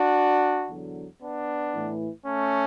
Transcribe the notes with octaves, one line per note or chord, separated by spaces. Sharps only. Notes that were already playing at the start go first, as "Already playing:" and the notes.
Already playing: D4 F#4
E2 D3 F#3
B3 D4
A2 E3
A3 C#4